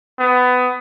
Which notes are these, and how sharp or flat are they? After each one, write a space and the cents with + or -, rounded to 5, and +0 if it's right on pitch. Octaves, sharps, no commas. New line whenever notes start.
B3 +20